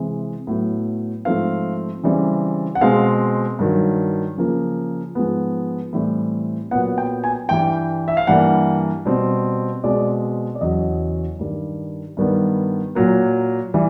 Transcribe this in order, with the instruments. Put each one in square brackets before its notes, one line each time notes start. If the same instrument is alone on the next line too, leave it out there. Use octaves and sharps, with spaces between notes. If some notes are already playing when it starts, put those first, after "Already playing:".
Already playing: [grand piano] C3 E3 G#3 C4
A2 F#3 B3
G#2 F3 A3 C4 F5
C#3 E3 G3 C4
F#5
B2 G#3 C4 F5
G2 D#3 F#3
C#3 F3 A#3
G#2 F3 G#3 B3
A2 E3 G3 C4
A#2 F#3 B3 F#5
G5
G#5
G2 E3 G3 G5
E5
F5
G2 E3 G3 A#3 F#5
B2 G3 C4
B2 G#3 C4 D5
D5
E2 C#3 F#3 D#5
G2 D#3 G3
G2 D#3 G3 B3
A#2 F#3 A#3
E3 G3